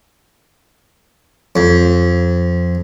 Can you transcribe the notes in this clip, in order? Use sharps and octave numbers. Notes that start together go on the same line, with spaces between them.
F2